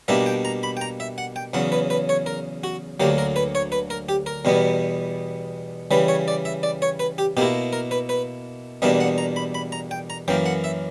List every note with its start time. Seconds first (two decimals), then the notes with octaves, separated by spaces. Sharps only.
0.08 B2 G3 A#3 D4 E5
0.26 G5
0.45 A#5
0.63 B5
0.77 G5
0.81 A#5
1.00 E5
1.18 F#5
1.36 G5
1.54 E2 C#3 F#3 F#5
1.72 B4
1.90 B4
2.09 C#5
2.26 A#4
2.64 F#4
3.00 D2 D3 F#3 A#3 G4
3.18 A#4
3.36 B4
3.55 C#5
3.72 B4
3.90 A#4
4.09 G4
4.26 A#4
4.45 E2 B2 G3 B3
5.91 C#3 E3 G3 B4
6.08 C#5
6.28 D5
6.45 E5
6.63 D5
6.82 C#5
6.99 B4
7.18 G4
7.37 B2 A#3 E4 G4
7.73 A#4
7.91 B4
8.09 B4
8.82 E2 B2 G3 A#3 D4 E5
9.01 F#5
9.18 A#5
9.36 B5
9.55 B5
9.72 A#5
9.91 G5
10.10 A#5
10.28 F#2 E3 A#3 G5
10.46 F#5
10.64 E5